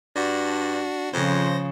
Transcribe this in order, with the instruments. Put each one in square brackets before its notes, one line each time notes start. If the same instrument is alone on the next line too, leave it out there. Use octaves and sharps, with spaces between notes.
[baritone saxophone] G2 [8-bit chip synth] D4 F#4
[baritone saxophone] F2 [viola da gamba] C#3 F3 [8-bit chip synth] C5 A#6